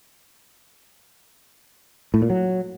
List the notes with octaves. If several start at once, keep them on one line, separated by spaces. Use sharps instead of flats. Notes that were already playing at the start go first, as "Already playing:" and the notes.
A2
A#2
F#3